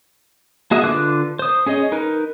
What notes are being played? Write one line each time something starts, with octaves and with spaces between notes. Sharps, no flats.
A#3 F#4 G#4 D#5 E5
D3 F4 B4 D6 F#6
C5 D#6
C#4 G#4 C#5 D#5
D#4 A#4 B4